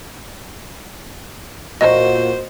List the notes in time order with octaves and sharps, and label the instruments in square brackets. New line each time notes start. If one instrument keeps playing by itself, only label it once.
[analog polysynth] A#2 A#3 F#4 [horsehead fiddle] C5 [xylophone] D#5